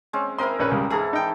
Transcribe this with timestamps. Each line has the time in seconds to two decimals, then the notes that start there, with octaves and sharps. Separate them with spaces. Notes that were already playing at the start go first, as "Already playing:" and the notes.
0.13 G#3 C4 C#4
0.38 C4 E4 A#4 D#5 C6
0.59 A#1 C#4 B4
0.71 C#2 G3
0.90 G#2 E3 G#4 A4 A#5
1.13 D#4 G5